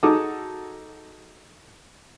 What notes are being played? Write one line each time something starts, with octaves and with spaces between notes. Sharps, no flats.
D#4 F#4 G#4 A4 D6 D#6